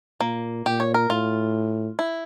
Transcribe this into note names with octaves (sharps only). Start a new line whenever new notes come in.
A#2 A#3
A#2 G4
C#5
A#4
A2 F4
E4